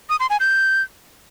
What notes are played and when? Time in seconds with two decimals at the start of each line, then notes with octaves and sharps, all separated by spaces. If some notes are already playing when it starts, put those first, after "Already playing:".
0.10 D#6
0.20 C6
0.30 G#5
0.40 G6